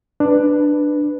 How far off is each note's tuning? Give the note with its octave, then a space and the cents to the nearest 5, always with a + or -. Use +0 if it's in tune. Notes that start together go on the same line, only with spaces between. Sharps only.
D4 +10 B4 +0